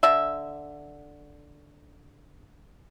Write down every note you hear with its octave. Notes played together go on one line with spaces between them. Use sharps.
D3 E5